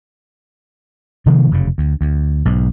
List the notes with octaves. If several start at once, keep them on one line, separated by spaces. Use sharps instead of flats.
C3 D#3 F3 A#3
F1 F#2 C#3
D2
D2
B1 G#2